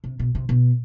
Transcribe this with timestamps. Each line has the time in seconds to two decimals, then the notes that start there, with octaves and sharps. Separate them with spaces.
0.04 C3
0.19 B2
0.35 C3
0.49 B2